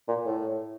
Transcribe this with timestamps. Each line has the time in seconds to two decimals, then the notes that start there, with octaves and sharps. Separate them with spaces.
0.08 A#2
0.26 A2